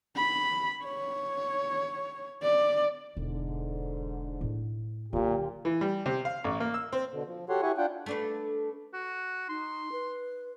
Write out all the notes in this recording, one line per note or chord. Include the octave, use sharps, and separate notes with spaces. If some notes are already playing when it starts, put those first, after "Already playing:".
B5
C#5
D5
E1 G#2 D3
A2 A3
A#2 D3 F#3 F4 G4
E3
G3
C3
F5
A1
A#3
E6
C4
B2 D3
F3
F#4 G4 A4 C#5 F#5 C6
E4 G4 F#5 G#5 C#6
D4 F4 F#5 G5
A3 D4 B4
F#4
D#4 C6
B4